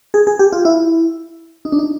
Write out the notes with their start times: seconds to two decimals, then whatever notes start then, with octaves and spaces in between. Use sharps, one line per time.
0.14 G#4
0.27 G#4
0.39 G4
0.52 F4
0.65 E4
1.65 D#4
1.72 D4
1.79 D#4